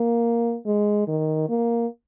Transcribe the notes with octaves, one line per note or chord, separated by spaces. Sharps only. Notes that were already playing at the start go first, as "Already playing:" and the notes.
Already playing: A#3
G#3
D#3
A#3